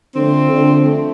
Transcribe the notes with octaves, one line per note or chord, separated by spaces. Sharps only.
D3 F3 A3 C4
D3
F3 A3 C4